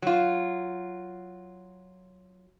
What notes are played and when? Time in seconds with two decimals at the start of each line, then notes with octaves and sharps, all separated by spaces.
0.02 F#3 F4